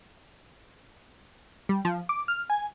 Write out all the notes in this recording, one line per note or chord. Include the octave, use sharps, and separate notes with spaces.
G3
F3
D6
F6
G#5